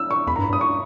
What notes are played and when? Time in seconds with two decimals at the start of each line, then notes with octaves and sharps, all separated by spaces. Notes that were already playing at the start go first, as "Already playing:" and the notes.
Already playing: E6
0.11 C#6
0.27 E2 B5
0.36 A#5
0.38 G2
0.44 B5
0.49 G2
0.53 D#6
0.61 C#6